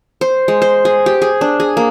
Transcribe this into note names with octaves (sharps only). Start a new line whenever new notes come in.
C5
G#3
C5
G#4
G4
G#4
D4
G#4
A#3